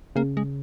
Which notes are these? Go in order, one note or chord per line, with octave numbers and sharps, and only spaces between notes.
C#3 A#3
G#3